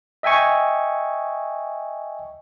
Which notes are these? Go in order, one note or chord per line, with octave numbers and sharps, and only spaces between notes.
D#5 E5 G5 G#5 C#6